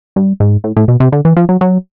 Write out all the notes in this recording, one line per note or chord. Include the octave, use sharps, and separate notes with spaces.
G2
G#2
A2
A2
B2
C3
D3
E3
F3
F#3
F#3